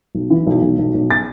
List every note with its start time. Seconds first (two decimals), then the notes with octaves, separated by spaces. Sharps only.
0.15 B1
0.30 E3
0.47 B1
0.62 B1
0.79 B1
0.94 B1
1.11 A6